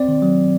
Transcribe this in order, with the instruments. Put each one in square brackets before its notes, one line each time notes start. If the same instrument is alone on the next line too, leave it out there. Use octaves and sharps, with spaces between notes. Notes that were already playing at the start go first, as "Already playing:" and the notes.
Already playing: [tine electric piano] C4 D5
D#3
F#3